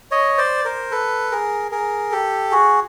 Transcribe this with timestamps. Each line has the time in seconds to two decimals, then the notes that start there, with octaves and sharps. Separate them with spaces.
0.11 C#5 D#5
0.38 C5 D5
0.65 A#4 C5
0.91 A4 B4
1.31 G#4 A#4
1.72 G#4 A#4
2.12 G4 A4
2.52 F#4 G#4